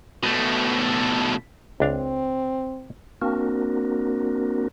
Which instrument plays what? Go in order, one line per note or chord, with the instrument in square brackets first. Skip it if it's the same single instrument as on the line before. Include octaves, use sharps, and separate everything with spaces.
[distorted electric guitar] B2 A3
[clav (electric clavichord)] C#2 D4 F5 [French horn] C4
[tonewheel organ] A#3 C4 D4 F#4 A#4